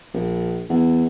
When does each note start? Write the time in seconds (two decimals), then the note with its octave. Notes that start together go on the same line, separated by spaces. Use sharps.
0.14 A#1
0.69 E2